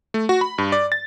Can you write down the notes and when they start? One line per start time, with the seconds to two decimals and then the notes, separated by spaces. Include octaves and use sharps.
0.14 A3
0.29 F#4
0.41 B5
0.58 G2
0.72 D5
0.92 A6